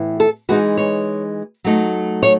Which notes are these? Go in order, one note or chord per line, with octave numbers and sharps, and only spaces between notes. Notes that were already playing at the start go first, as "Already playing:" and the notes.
Already playing: A2 E3 B3 E4
A4
E3 G#3 D#4 F#4
C#5
F#3 A3 D#4
C#5